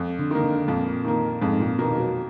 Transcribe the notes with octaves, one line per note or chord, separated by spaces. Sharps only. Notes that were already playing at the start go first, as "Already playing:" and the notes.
Already playing: F2
D3
D#3 A#3
D3
F2 A#2
D#3 A#3
F2 G#2
A#2
B2 D#3 A#3
F#3